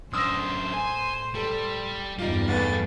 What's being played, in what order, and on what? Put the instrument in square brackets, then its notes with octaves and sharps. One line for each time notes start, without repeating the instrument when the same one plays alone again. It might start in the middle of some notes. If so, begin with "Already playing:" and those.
[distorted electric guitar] F#2 D4 [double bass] A2 [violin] C5 [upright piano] D#6 E6 A#6
[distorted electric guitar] G#5
[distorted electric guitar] G3 [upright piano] A4
[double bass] E2 G2 [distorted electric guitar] G3 D5 [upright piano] D#4 F4
[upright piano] B1 B3 B4 [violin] A3 A6